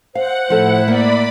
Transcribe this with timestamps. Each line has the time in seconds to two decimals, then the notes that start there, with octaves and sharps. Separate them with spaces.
0.15 C5 F5 F#5
0.50 A2 F3 E4 A4
0.88 A#3 D5 B5